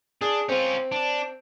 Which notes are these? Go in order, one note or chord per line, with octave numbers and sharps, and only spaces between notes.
D4 G#4
C4 C#4 F4
D4